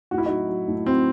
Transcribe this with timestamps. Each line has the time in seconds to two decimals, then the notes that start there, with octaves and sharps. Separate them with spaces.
0.11 A2 F#4
0.18 E4
0.25 F#3 D#4 F#4
0.49 F#3
0.68 A2
0.86 F#3 C4